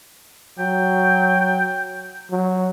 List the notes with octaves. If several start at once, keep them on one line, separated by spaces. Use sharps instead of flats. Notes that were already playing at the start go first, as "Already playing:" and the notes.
F#3 G5
F#3